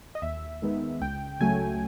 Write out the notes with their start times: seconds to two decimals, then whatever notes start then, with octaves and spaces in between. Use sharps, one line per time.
0.15 D#5
0.22 D#2 E5
0.62 D#3 G#3 B3 D#4
1.01 C#2 G5
1.40 C#3 F#3 A3 G#5